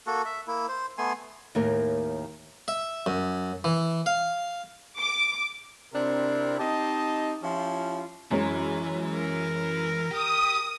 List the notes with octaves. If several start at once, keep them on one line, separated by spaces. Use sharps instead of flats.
A#3 F#4 A4
E5
A#3 E4
C5
A3 B3 G#5 C6
D#2 A2 D#3 A#3 A#4
E5
F#2
E3
F5
D6
C3 C4 D4 E4 A#4
C4 D#4 G4 D#5 A5
F3 C#4 E4 F4 G4
F#2 E3 G#3 C#4
A#4
G4 D#6